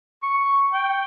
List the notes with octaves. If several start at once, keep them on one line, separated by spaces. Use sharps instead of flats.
C#6
G5